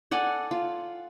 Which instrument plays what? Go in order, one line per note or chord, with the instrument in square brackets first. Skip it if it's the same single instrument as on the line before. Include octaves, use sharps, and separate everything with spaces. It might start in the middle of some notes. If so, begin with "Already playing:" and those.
[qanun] A4 D5 F#5 G#5
F4